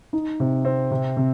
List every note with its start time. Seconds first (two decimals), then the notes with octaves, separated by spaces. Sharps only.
0.13 D#4
0.40 C3
0.65 C4
0.91 C3
1.17 C3